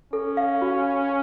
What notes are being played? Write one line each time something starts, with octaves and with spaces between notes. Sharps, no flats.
C#4 A4
F5
F#4